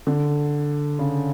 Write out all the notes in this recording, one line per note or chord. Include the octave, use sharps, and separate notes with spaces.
D3
C#3